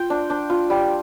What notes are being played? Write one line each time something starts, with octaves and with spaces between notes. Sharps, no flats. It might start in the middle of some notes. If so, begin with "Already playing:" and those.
Already playing: F4 G5
D4
D4
F4
G3